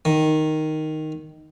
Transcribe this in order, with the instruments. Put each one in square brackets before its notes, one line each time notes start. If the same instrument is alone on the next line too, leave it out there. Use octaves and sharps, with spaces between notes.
[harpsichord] D#3